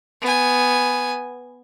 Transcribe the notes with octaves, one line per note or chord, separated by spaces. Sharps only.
B3 G#5